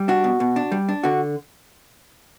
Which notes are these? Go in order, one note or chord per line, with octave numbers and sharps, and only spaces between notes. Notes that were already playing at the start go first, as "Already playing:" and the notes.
Already playing: G3
D4 F#4
B2
B2
D4
G3
D4
D3 F#4